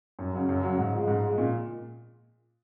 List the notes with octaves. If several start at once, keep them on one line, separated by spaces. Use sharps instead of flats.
F#2
C#3 F#3
F#2
C#3 F#3
G#2
F3 G#3
G#2
F3 G#3
A#2